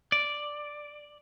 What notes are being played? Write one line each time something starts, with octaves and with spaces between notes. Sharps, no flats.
D5